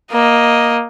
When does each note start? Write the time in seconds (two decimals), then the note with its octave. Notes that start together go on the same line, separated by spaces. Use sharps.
0.12 A#3 D#5